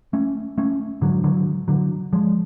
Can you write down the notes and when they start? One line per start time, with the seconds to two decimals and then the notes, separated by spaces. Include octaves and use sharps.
0.13 A3 C#4
0.58 A3 C#4
1.01 G#2 D3 F#3
1.24 D3 F#3
1.68 D3 F#3
2.13 F3 G#3